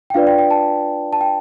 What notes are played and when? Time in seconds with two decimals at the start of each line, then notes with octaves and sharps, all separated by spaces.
0.10 G5
0.14 D4 F4 B4 D5 F5
0.27 G5
0.38 G5
0.51 A5
1.13 A5
1.21 G5